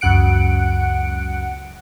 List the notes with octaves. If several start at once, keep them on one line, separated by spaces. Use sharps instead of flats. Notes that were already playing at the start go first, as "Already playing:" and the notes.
C#2 F#2 F#5 F#6 C#7 D7